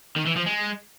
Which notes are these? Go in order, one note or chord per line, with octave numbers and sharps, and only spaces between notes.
D#3
E3
F3
G#3